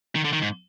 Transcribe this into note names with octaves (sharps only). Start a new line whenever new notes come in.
D#3
D3
D#3
G#2